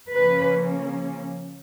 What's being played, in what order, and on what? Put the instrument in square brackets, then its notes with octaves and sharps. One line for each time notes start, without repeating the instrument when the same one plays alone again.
[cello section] C#3 F3 A#3 C#4 B4